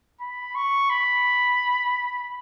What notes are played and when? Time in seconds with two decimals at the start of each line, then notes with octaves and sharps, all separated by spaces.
0.20 B5
0.55 C#6
0.90 B5